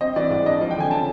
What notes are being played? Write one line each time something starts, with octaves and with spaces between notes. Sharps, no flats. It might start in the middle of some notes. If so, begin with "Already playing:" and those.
C4 D#5
E3 D5
G#2 D5
D4 D#5
F3 D5
G5
D3 G#5
C#3 A5